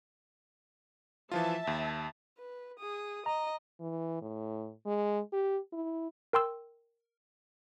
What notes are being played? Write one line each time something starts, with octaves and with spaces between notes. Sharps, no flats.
E3 F3 F4 E5 A5
D#2
B4
G#4 D#6
D#5 A#5
E3
A2
G#3
G4
E4
A#4 G5 C6 E6